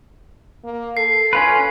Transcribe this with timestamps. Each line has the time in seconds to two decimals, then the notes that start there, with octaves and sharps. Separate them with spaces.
0.64 A#3
0.97 A4 C7
1.33 C#4 F4 B4